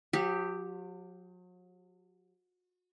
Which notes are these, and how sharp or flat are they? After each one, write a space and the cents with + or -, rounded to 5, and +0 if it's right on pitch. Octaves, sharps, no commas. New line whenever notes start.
F#3 -40 G4 +0